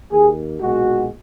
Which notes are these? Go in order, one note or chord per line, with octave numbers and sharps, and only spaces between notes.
D#2 D#3 A#3 G#4
B1 A#2 G#3 F#4